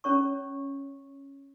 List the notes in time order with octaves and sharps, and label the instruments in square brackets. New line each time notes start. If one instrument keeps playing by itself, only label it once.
[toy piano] C#4 C#5 C#6